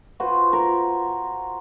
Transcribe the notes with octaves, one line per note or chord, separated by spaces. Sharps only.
F4 F#4 B4 C5
A#4